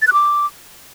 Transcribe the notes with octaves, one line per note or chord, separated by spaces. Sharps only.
A6
F#6
D6